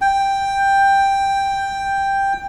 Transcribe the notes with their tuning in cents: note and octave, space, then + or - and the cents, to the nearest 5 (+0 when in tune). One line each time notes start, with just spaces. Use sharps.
G5 +5